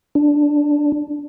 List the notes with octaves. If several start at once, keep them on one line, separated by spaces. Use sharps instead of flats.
D4